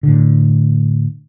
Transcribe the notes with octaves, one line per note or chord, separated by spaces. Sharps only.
A2 D3